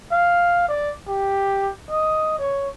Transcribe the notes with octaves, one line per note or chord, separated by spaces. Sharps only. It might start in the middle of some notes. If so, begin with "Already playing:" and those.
F5
D5
G4
D#5
C#5